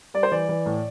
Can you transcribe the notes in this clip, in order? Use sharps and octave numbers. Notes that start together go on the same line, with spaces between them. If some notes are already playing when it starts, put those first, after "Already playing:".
G3 D5
C5
E3 D5
E3
A2